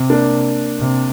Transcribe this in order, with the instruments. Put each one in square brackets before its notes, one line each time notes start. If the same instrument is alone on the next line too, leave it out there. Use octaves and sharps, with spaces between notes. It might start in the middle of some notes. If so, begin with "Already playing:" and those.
Already playing: [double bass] C3
[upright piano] A#3 D4
[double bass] C3